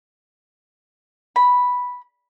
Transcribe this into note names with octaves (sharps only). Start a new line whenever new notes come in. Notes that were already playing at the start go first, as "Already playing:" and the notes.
B5